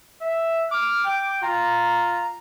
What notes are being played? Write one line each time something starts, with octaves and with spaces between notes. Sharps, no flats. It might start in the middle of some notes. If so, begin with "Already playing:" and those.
E5
D6 F6
G5
F4 A#5